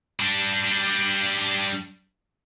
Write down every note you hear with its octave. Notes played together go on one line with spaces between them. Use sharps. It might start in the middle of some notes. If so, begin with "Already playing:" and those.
G3 D4